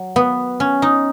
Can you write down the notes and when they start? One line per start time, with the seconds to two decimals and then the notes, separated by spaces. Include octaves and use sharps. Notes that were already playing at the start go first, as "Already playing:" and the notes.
Already playing: F#3
0.16 B3
0.60 C#4
0.82 D#4